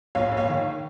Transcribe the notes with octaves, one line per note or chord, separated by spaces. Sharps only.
A#1 C#5 F5
A#1
C#5 F5
D#3